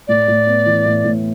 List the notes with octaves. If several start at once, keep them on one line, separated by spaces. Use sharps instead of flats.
A2 D5
A2
B3
E3
A2
A2